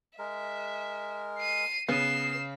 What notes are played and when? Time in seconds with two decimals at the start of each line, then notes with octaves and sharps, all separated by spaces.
0.19 G#3 A#4 E5
1.38 C7 D#7
1.89 C#3 B3 C7 D#7 E7